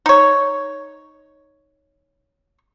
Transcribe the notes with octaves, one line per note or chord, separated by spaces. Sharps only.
D#4 C#5